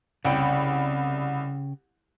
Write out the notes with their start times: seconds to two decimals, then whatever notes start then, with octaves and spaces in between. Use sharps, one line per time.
0.25 C2 C#3 C#5 G5 B5